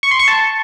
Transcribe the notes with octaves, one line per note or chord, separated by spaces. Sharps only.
C#6
C6
C#6
A5